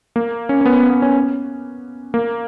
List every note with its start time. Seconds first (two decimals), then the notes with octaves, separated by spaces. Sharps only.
0.16 A#3
0.49 C#4
0.61 C#4
0.66 B3
0.90 B3
1.02 C#4
2.14 A#3